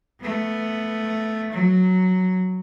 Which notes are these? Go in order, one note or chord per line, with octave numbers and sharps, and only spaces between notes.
A3 B3
F#3